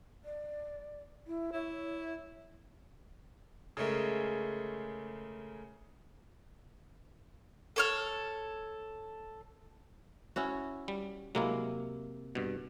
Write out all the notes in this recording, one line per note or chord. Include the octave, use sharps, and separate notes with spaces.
D5
E4
E4 C#5
C#3 G#3 A3 A#4
A4 C#5 F6
C#4 E4 F#4
G3
C3 F#3 G#3 A#3 E4
G2 B2